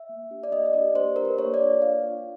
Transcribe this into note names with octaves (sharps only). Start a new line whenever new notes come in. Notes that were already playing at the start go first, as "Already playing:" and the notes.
Already playing: E5
A#3
D4 G4
D5
A#3 D#5
D#5
D4 G4 D5
A#3 C5
D4 G4 A#4
B4
A#3 C#5
D5
D4 F4
A#3 F5
D4 F4